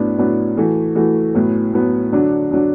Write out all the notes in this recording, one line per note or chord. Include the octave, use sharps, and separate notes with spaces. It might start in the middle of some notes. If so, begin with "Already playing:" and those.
Already playing: A2 F#3 B3 D4
A2 F#3 B3 D4
E3 A3 F#4
E3 A3 F#4
A2 F#3 B3
A2 F#3 B3
D3 F#3 D4
D3 F#3 D4